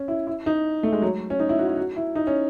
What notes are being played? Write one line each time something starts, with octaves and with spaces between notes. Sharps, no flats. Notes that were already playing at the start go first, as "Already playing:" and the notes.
Already playing: C#4
E4
E4
D#4
A3
G#3
F#3
C#4
D#4
E4
F#4
E4
F#4
E4
D#4
C#4